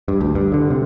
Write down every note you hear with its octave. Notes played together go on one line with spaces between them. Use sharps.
G2
D2
G2
D3
C3